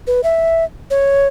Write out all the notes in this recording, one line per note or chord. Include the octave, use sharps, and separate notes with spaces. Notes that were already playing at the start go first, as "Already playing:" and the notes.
B4
E5
C#5